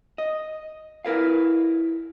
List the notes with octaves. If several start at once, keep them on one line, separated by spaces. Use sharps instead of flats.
D#5
E4 A#4 B4 F5